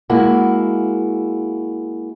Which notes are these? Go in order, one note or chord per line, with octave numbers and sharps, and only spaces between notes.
G#3 A#3 E4 F#4